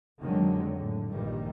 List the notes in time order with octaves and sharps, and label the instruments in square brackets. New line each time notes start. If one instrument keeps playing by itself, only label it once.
[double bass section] F2 D3 D#3 F#3 G#3
A2 D3
A#1 G2 A#2 D#3 G3